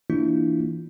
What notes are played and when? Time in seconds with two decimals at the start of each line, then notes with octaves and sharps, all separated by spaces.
0.10 E3 A#3 D4 E4 F4